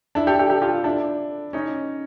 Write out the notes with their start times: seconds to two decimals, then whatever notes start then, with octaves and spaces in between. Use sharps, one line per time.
0.15 D4 E4
0.27 G4 A4
0.39 G4 A4
0.50 G4 A4
0.62 F4 G4
0.84 D4 E4
1.53 C#4 D#4